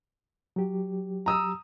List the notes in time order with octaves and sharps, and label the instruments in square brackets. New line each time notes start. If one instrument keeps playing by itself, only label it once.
[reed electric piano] F#3 G4
[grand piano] A#5 D#6 E6